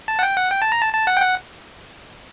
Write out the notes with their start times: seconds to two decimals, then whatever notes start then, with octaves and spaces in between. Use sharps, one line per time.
0.08 A5
0.19 F#5
0.23 G5
0.37 F#5
0.51 G5
0.62 A5
0.72 A#5
0.82 A5
0.93 A5
1.07 F#5
1.17 G5
1.22 F#5